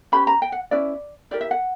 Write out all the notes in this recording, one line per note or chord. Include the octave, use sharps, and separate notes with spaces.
C#4 G4 B4 B5
A#5
G5
F#5
C#4 E4 B4 D5
E4 G4 A#4 D5
E5
F#5